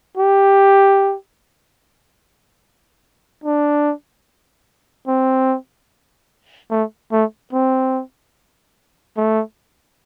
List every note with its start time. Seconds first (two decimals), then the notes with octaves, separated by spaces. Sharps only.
0.17 G4
3.44 D4
5.07 C4
6.71 A3
7.12 A3
7.53 C4
9.17 A3